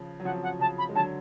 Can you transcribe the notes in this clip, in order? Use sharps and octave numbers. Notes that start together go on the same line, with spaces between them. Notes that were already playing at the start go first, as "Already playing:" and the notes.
Already playing: C#3 F3
F#3
C#3 F3 F#5
F#5
C#3 A5
B5
G#3
D3 F#3 A5